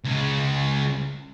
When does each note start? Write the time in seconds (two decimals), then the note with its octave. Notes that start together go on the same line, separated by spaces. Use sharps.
0.05 C#2 C#3